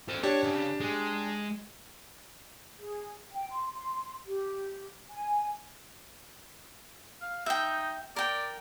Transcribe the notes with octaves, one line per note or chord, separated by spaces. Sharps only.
A4 C5
D4 G4 C#5
C#3
G#3
G#4
G5
C6
C6
G4
G#5
F5
D#4 E5 G5
A#4 D5 G5